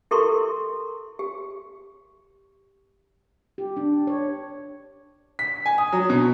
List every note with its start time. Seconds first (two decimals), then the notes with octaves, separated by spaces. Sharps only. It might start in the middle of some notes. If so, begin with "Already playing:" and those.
0.11 E4 G4 A4 A#4 C6 C#6
1.19 G4
3.58 G4
3.77 D4
4.07 C#5
5.39 B6
5.66 G#5
5.78 D#6
5.92 F#3
6.10 B2